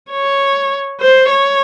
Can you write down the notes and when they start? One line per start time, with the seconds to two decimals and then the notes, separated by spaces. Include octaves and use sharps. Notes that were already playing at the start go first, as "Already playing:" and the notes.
0.11 C#5
1.01 C5
1.31 C#5